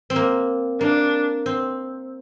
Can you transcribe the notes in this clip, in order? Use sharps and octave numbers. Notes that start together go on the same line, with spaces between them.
C4
A#3
A#3 D4
C4